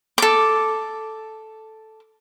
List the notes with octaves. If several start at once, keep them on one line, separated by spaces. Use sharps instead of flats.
A4 D6